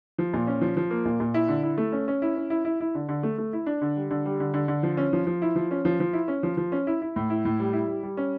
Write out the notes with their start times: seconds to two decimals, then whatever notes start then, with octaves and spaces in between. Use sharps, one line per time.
0.18 F3
0.33 A#2
0.47 C#4
0.61 F3
0.77 F3
0.90 A#3
1.05 A#2
1.20 A#2
1.34 E4
1.49 D3
1.63 E4
1.78 A3
1.92 C#4
2.08 C#4
2.22 E4
2.36 C#4
2.50 E4
2.65 E4
2.80 E4
2.95 D3
3.09 D3
3.23 A3
3.38 A3
3.53 E4
3.66 D4
3.82 D3
3.97 G3
4.11 D3
4.25 G3
4.40 D3
4.54 D3
4.68 D3
4.83 F3
4.97 C#4
5.13 F3
5.27 F3
5.42 E4
5.56 F3
5.71 C#4
5.85 F3
6.00 F3
6.13 E4
6.28 C#4
6.43 F3
6.57 F3
6.72 C#4
6.87 E4
7.02 E4
7.16 A2
7.30 E4
7.45 A2
7.60 G3
7.73 E4
7.88 G3
8.03 G3
8.17 C#4